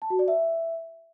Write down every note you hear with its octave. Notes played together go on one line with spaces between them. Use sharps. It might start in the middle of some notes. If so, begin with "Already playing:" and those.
A5
F#4
D5
E5